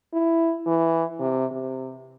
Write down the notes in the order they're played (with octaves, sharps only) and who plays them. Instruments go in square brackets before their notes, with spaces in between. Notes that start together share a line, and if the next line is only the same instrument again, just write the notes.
[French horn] E4
E3
C3
C3